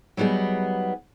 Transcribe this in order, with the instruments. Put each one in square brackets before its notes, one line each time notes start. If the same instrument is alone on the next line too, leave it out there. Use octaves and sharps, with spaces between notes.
[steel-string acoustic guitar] F#3 G3 B3 D#4 G#4